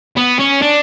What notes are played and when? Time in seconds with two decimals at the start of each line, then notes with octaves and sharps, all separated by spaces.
0.17 B3
0.40 C#4
0.62 D4